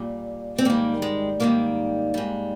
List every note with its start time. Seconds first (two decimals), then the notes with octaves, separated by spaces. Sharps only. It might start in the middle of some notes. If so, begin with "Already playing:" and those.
Already playing: A#2 G3
0.58 C4
0.65 G#2 D#3 G3 A#3
1.02 G#3
1.40 G#2 D#3 G3 A#3
2.14 G#2 G3